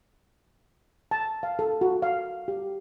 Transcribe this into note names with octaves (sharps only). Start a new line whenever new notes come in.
A5
F5
A4
F#4
F5
G4